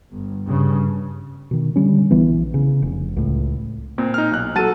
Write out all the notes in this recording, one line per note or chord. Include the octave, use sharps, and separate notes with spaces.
G1
G2 C#3
B2 D#3
D3 F3 G3 C#4
A#1 E3 B3
C#3
F1
C#2 A2
A#2 C4
D#4 F6
B1 F#6
F#3 A4 A5 A6 D#7